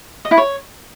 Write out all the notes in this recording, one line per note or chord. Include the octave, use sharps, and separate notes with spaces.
D#5
E4
C#5